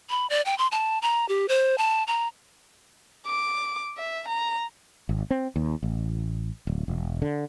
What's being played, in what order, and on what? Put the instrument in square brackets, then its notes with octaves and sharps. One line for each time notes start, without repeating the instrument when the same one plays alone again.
[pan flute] B5
D5
G5
C6
A5
A#5
G4
C5
A5
A#5
[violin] D6
E5
A#5
[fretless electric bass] G#1
C4
D#2
A1
D1
E1
D3